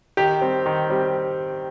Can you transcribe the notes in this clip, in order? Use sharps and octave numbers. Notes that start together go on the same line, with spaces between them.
D#3 G4
G3 C4
D#3
G3 C4